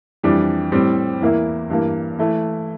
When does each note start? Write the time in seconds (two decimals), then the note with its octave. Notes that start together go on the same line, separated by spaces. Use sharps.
0.23 F2 E3 G3 D4
0.72 A2 G3 C4
1.21 E2 E3 A#3 E4
1.70 G2 E3 A#3
2.19 E3 A3 E4